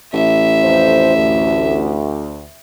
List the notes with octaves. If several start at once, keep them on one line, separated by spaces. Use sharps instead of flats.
A1 E5
F2 C5
D2